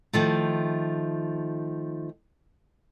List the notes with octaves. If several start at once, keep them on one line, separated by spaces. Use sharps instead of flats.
D#3 F3 A3